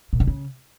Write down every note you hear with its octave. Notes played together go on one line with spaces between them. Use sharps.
A#2
D3
C#3